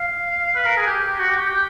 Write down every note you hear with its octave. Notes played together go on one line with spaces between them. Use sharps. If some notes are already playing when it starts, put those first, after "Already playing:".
Already playing: F5
B4
A#4
G#4
G4
G4
F#4
G4
G4
G4